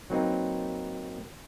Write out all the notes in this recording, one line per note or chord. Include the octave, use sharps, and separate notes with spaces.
F#3 A#3 C4 D#4 B4